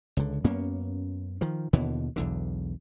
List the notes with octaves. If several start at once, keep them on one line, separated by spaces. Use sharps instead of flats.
C#2 D3
F#2 A#3 B3 C#4
D#3 F3
D#2 B2 D3 E3
B1 E2 D3